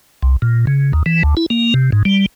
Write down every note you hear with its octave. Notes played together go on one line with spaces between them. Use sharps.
C2
A#2
C#3
D#2
E3
D2
E4
A#3
C3
G#2
G3